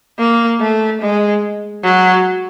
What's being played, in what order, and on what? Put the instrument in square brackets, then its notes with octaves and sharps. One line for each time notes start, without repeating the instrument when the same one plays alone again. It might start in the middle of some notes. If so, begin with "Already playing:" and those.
[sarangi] A#3
A3
G#3
F#3